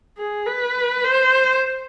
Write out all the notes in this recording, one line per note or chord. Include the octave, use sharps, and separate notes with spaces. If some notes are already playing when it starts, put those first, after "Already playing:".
G#4
B4
C5